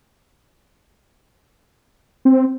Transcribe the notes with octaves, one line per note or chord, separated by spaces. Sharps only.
C4